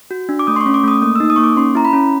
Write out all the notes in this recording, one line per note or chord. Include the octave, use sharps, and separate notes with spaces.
F#4
D4
D6
A3 D#6
C6
C#6
C#4
D6
A3 D#6
A#3 D#6
D#4 E6
D#6
A#3 C#6
D6
C#4 C6
E4 A#5
B5
C#4